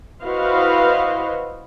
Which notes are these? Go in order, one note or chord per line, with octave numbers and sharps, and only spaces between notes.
E4 F#4 B4 C5 D#5 F5